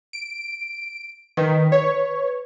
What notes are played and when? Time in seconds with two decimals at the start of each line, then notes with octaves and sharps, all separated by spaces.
0.13 D7
1.37 D#3 B4
1.72 C#5